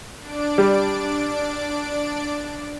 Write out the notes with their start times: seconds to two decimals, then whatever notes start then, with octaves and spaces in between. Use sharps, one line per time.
0.20 D4 D5 D7
0.58 G3